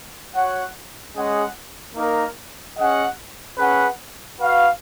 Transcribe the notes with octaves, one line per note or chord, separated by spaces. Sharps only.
F#4 C#5 F#5
G#3 C#4 G#4 D#5 F#5
A#3 D#4 A#4
C#4 G#4 D#5 F#5
C#4 G#4 B4 F#5
F#4 B4 F5